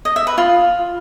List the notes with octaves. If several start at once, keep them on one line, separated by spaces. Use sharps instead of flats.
D#5
E5
B4
F4